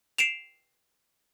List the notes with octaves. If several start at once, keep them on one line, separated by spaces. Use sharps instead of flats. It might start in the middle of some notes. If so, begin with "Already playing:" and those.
C7 D7 E7 F7